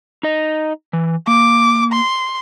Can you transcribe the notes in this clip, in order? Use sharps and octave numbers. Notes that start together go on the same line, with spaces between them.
D#4 D#5
E3
A#3 D6
C6